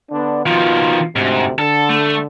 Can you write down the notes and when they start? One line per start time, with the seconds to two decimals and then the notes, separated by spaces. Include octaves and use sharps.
0.11 D3 B3 D4
0.46 B2 D#3 F3 F4
1.16 D2 G#2 C3
1.58 D3 A4
1.89 A3